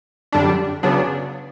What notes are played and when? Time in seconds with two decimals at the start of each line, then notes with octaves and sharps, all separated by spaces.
0.32 F#2 D3 G3 D4
0.83 C#3 F#3 B3 D4